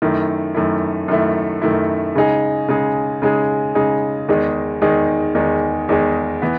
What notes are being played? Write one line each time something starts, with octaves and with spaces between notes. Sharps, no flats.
F#2 D#3 A3 E4
F#2 D#3 A3 E4
F#2 D#3 A3 E4
F#2 D#3 A3 E4
C#3 G#3 D#4 G#4
C#3 G#3 D#4 G#4
C#3 G#3 D#4 G#4
C#3 G#3 D#4 G#4
E2 D#3 G#3 D#4 G#4
E2 D#3 G#3 D#4 G#4
E2 D#3 G#3 D#4 G#4
E2 D#3 G#3 D#4 G#4
E3 B3